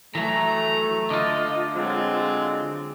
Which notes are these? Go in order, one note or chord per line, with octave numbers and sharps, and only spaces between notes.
E3 F#3 A3 A#5
D3 F4 D#5
F#3 G#3 C4